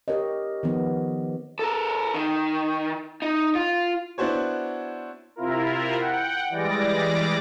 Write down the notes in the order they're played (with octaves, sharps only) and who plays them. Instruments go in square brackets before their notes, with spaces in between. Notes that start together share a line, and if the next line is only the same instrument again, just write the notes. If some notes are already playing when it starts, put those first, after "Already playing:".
[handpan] G4 A#4 C#5 D#5
D#3 F3 B3
[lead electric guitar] A4 A#4
D#3
D#4
F4
[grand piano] B3 D4 E4 F#4 C5 C#5
[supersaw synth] C3 E4 F4 A#4
F#5 G5
E3 G3 G#3 D5 D6 A#6